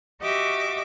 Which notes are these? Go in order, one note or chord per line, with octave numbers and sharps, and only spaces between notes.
F#4 G4 D#5 E5 D6